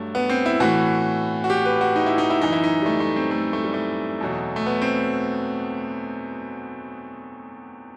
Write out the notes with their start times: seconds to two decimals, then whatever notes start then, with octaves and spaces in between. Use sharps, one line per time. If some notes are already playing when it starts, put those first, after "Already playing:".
Already playing: G2 F#3 A3
0.15 B3
0.29 C4
0.46 E4
0.60 A2 E3 F#4
1.44 F#4
1.50 G4
1.65 B4
1.81 F#4
1.96 D#4
2.06 E4
2.18 D#4
2.30 E4
2.41 F#2 E3 D#4
2.52 E4
2.64 D#4
2.82 G3
2.86 A3
3.00 A3
3.16 C4
3.31 A3
3.53 A3
3.64 G3
3.74 A3
4.21 E2 B2 F#3
4.56 A3
4.66 B3
4.82 C4